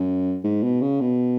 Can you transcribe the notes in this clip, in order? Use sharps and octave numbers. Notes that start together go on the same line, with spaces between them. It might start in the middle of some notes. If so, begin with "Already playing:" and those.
Already playing: F#2
G#2
B2
C#3
B2